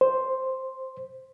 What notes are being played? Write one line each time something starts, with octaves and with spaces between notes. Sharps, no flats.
C5